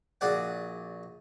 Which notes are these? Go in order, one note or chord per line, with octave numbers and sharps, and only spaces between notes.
A#1 F#4 G#4 D5 F#5